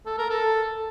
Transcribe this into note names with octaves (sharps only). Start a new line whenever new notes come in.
A4
A#4
A4